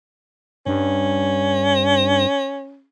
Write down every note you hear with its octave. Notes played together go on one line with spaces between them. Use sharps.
G2 C#4